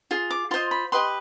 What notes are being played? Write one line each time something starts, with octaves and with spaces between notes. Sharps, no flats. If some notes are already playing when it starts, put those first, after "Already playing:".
F4 G#4
D6
F4 C5 D#5 C6
B5
G4 B4 D#5 C6